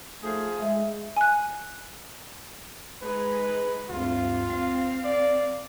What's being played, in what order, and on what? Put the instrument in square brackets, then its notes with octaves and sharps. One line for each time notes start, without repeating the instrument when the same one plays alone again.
[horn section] F3 D#4 G#4 [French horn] A3
[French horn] G#3 [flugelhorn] E5
[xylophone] G#5 F#6
[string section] G#3 D#4 [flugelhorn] B4
[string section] D2 G2 C3 [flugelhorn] F4
[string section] C4 F5
[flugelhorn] D5